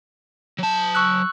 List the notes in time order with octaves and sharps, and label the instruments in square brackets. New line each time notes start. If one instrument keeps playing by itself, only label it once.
[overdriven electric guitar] F#3 A5
[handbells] C#6 E6 F#6